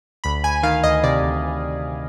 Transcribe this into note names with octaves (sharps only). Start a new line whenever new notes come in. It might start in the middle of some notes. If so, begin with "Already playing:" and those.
D2 B5
D2 G#5
D#3 F5
D2 D#5
C3 D5
D2